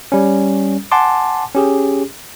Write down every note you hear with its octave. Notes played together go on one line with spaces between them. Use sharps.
G3 C#4
F#5 G#5 A5 C6 D6
C#4 G4 G#4